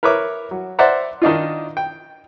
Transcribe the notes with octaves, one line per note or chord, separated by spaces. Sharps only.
A#4 B4 C#5 E5 D6
F#3
C5 D5 E5 F#5 A#5
D#3 D4 D#4 F4
G5